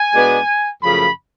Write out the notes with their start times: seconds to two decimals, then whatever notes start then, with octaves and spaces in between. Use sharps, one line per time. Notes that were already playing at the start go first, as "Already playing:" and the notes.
Already playing: G#5
0.13 B2 G#3 B3 D4
0.82 F#2 C#3 F3 A3 B5